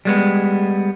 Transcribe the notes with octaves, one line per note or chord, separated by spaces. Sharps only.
G3 G#3 B3